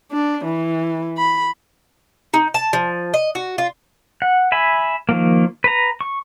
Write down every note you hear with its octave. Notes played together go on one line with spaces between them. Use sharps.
D4
E3
B5
D#4
A5
F3
D#5
F#4
F4
F#5
E5 G#5 B5
D#3 F3 A#3
B4 A#5
C#6